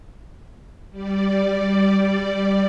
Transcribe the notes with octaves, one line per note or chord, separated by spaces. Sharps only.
G3 D5